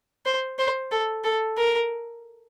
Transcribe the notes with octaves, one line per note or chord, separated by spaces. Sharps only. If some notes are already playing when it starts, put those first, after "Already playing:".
C5
C5
A4
A4
A#4